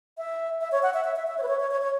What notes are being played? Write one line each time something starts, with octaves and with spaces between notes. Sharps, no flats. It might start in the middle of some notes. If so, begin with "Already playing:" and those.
E5
E5
C#5
F#5
E5
E5
E5
E5
C#5
B4
C#5
C#5
C#5
C#5